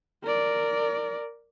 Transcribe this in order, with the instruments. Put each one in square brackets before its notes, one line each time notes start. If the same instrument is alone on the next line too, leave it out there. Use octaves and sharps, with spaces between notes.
[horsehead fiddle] A#4 D5